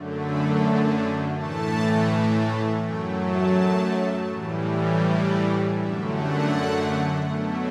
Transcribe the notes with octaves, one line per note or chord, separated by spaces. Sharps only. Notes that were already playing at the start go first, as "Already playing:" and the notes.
Already playing: F#2 D3 A3
B5
A2 E3 A3 A5
F#2 F#3 A3 G5
A5
A2 E3 G3
D5
F#2 D3 A3 E5
F#5
B2 F#3 A3